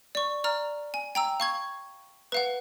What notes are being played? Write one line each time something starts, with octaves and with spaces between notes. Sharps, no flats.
D5 C#6
D5 A#5 F6
G#5
G5 A#5 E6
F5 C#6 G#6
B4 F5 F#5